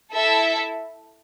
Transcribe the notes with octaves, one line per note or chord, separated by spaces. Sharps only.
E4 A4 E5